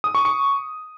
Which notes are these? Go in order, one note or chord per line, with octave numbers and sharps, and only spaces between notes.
D#6
C#6
C#6